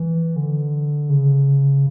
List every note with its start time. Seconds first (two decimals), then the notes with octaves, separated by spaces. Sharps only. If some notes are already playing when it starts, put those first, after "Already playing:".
Already playing: E3
0.36 D3
1.09 C#3